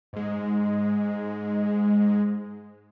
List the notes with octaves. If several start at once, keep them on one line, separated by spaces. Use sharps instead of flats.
G#2 G#3